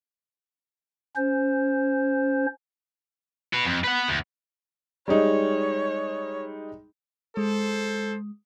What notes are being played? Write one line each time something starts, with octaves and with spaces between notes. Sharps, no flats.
C#4 C5
F#4 B4
F2
B4 F#5
D2
G3 G#3 D#4 C#5
G#3 A4 C5